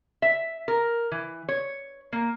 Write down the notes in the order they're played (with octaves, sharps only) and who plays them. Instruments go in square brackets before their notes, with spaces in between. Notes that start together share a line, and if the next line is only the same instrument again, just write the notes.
[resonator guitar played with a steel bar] E5
A#4
E3
C#5
A#3